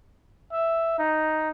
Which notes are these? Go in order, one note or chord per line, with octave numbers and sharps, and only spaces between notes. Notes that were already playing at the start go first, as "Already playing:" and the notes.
E5
D#4